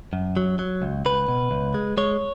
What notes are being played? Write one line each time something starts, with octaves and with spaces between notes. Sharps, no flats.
F#2
F#3
F#3
C#2
C#2 B4
B2
C#2
G#3
G#3 C#5